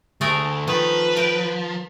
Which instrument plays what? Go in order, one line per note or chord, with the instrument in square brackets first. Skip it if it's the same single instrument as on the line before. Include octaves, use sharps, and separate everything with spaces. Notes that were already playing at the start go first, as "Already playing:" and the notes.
[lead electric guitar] D2 [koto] A3 G#4 A#4
[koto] D#3 [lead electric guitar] F3 [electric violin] B4
[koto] A#4 G5